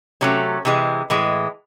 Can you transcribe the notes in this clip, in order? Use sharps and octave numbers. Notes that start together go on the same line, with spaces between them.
C3 F#3 A3 C#4
C3 E3 G#3
A2 E3 G#3